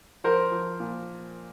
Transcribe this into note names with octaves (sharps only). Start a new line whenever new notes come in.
F3 A#4 C5
F3
A#2